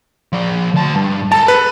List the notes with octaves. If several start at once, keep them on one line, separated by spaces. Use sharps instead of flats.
F3 D5
D2 A5
G2
A4 A#4 A5
B4